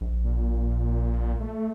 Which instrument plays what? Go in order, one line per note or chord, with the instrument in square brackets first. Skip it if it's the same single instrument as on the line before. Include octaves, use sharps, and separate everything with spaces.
[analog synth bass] A#1
[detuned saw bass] A#2
A3